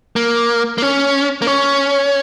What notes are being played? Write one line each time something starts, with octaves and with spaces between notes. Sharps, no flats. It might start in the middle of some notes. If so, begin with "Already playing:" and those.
A#3
A#3
C#4
A#3
C#4